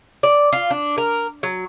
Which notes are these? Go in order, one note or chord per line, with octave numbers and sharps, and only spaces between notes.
D5
F4
D4
A#4
F#3